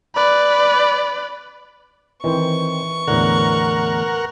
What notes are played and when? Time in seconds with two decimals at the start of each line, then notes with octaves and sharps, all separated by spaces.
0.15 B4 D5
2.24 D#3 E3 C4 C5 C#6
3.08 E2 A2 D3 A#4 F#5